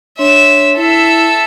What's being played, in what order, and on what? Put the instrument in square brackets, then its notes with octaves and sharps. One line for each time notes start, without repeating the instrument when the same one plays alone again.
[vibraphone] D4 C#5 C6 [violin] E5 E7
[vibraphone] E4 [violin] A4 E5